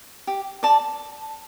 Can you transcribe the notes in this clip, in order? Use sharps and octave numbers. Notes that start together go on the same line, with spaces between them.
G4
D5 A5